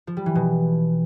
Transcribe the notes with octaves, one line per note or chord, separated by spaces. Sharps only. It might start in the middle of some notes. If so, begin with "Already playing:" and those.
F3
G3
E3
B2